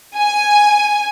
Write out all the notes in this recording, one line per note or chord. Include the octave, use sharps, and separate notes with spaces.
G#5